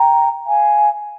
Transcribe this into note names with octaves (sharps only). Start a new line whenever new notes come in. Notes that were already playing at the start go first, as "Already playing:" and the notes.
Already playing: G5 A#5
F5 G#5